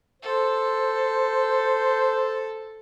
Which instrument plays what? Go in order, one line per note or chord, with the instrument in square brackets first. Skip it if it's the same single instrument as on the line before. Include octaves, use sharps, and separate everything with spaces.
[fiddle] A4 [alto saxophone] C5